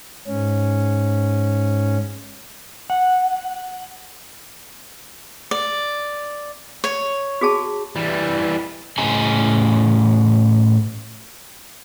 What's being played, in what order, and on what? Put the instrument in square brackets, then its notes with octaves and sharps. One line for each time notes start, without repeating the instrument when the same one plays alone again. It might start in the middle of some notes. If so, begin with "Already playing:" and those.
[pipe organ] G#2 C#4
[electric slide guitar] F#5
[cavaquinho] D5
C#5
[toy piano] F#4 G#4 A5
[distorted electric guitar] E3 G3
[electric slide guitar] A2 C#4 G#4 D#5 G#5 A#5